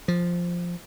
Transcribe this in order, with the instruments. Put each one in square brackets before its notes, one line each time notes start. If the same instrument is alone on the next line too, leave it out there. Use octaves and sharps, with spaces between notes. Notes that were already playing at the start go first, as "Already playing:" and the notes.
[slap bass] F3